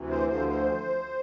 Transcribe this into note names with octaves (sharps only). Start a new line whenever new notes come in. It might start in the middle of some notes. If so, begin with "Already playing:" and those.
Already playing: D2 C3 E3
C5
D2 D3 F3 C5
C5